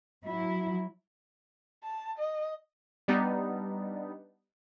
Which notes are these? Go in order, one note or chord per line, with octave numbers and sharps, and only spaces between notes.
F#3 E4
A5
D#5
G3 B3 D4 D#4